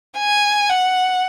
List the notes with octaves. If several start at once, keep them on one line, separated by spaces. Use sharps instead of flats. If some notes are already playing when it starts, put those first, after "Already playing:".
G#5
F#5